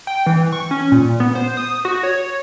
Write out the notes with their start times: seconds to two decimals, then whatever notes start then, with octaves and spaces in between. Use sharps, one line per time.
0.07 G5
0.26 E3
0.52 C#6
0.71 C#4
0.92 A#2
1.20 B3
1.35 C5
1.57 D#6
1.85 F#4
2.03 C#5